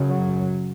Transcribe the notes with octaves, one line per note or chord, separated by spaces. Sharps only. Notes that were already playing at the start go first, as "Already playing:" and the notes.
Already playing: F#2 C#3
F#3